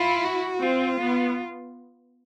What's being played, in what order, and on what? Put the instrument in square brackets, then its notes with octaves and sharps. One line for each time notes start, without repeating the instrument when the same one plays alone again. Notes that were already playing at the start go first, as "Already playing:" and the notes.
Already playing: [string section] E4 [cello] F4
[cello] F#4
[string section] C4 [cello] F4
[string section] B3